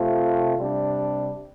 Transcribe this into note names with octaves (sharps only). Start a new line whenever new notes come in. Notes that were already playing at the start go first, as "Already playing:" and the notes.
Already playing: C3 A3 C4 F4
C3 G3 D4